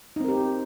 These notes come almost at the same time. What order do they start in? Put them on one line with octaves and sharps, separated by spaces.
D#4 C4 A#4 G4